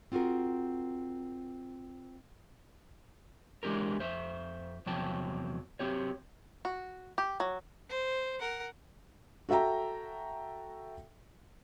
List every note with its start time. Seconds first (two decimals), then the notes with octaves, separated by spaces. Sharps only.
0.12 C4 F4 F#4 G#4 A#4
3.63 E3 G#3 D4 G4 A#4
3.99 F2 C5 E5
4.86 E2 C3 F3 F#3 G5 A5
5.79 F#3 C4 G4 C#5
6.65 F#4
7.18 G4
7.40 F#3
7.89 C5
8.39 A#4 F#5
9.49 F#4 A4 E5 G5 A#5